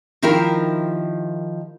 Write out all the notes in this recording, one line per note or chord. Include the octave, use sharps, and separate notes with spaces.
D#3 F3 E4 F4 G4 A#4